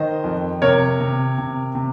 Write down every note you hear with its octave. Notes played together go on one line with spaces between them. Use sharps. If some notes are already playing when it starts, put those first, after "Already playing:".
Already playing: D#3 C5 D#5
F2
C3 A#4 C#5
C3
C3
C3